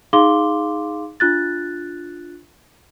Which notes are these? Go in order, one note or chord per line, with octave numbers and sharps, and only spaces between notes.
D#4 G#4 F5 C6 D6 G7
D4 F4 F#6 A6